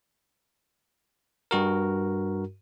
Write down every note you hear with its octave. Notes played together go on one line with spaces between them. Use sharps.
G2 F#4 A#4